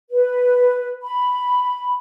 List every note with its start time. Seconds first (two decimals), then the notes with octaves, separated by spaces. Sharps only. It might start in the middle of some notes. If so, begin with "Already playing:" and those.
0.10 B4
1.02 B5